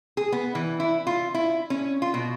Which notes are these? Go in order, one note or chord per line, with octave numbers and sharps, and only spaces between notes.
G#4
B3
E3
E4
F4
E4
C#4
F4
B2